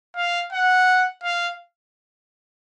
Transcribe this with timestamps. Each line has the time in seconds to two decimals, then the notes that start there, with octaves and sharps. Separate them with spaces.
0.16 F5
0.53 F#5
1.23 F5